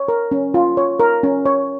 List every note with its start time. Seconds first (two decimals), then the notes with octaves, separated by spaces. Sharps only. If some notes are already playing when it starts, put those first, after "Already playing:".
Already playing: C#5
0.08 A#4
0.31 C#4
0.54 F4
0.77 C#5
1.00 A#4
1.23 C#4
1.46 C#5